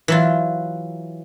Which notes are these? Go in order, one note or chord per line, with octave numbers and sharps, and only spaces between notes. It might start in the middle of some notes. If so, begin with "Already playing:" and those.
E3 F#3 F4